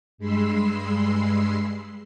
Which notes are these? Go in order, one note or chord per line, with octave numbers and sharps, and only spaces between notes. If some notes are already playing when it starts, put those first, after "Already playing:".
G2 G#3 B5 C6 E6 C7